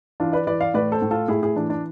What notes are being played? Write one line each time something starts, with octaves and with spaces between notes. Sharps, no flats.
E3 D4 F4
B4 D5
E3 B4 D5
D5 F5
A2 B4 D5
A4 C5
A2
F4 A4
A2 E4 G#4
E4 G#4
E3 D4
D4